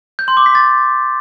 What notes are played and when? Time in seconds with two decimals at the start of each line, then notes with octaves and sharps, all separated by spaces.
0.19 G6
0.28 C6
0.37 D6
0.46 B6
0.55 A6